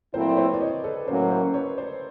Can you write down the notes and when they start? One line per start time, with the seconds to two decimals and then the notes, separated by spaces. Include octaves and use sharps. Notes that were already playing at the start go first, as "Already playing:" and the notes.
0.14 A#2 F#3 A3 C4 E4 A#4 C5
0.29 D5
0.37 B4 C#5
0.54 D5
0.61 C#5 D#5
0.84 A4 B4
1.07 A2 F#3 A#3 C#4 A#4 C5
1.31 A#4 C5
1.54 B4 C#5
1.78 C5 D5